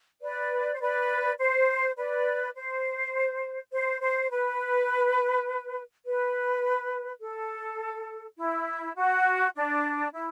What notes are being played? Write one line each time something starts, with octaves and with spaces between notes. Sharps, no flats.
B4 D5
C5
B4 D5
C5
B4 D5
C5
C5
C5
B4
B4
A4
E4
F#4
D4
E4